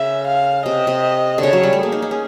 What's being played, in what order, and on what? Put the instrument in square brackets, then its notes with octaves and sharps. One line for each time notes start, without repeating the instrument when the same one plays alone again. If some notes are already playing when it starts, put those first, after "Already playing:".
Already playing: [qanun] C#3 [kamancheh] E5
[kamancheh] F5
[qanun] C3 [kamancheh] D#5
[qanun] C3
D3
[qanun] C#3 [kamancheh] C#5
[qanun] F#3
G3
A3
[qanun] A#3 [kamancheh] G#4
[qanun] D#4
D#4
C#4